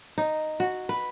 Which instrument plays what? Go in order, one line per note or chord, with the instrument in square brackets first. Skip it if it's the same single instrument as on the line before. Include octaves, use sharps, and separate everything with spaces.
[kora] D#4
F#4
B4